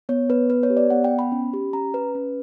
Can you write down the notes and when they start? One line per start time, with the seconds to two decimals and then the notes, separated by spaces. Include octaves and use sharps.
0.09 B3 C#5
0.30 B3 B4
0.50 B3 B4
0.63 C#5
0.70 G4
0.77 D5
0.90 B3 F#5
1.04 G5
1.11 B3
1.19 B5
1.32 C#4
1.53 G4
1.73 C#4 A#5
1.94 C#4 B4
2.15 C#4